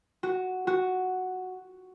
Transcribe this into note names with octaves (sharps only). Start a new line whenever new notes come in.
F#4
F#4